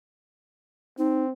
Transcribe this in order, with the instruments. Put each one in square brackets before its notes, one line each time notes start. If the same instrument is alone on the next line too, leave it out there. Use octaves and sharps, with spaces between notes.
[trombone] C4 [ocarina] D#4